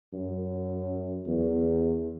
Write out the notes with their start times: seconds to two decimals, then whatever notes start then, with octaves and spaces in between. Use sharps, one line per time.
0.13 F#2
1.27 E2